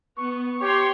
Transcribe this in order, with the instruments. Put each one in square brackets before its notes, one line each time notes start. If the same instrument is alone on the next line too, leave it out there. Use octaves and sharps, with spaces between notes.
[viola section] B3 [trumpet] C#6
[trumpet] G4 [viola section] C#5 C6